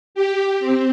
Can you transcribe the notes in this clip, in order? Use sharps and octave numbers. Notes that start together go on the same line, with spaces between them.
G4
C4